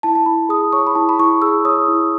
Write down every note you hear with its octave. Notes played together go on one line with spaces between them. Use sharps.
E4 A5
A5
E4 B5
G#4 D#6
C#5 C#6
B5
E4 A5
B5
E4 C#6
G#4 E6
C#5 D#6
E4